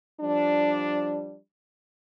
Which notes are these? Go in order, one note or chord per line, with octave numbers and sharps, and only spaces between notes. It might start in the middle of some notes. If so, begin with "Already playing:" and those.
F3 G3 D4